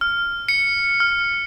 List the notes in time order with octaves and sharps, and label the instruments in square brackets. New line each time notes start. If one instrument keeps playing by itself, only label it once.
[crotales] F6
C#7
F6